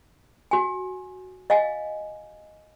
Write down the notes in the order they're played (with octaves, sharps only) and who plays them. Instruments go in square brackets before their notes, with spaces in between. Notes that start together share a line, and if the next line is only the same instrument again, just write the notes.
[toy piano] F#4 G#5
D#5 F5 G#5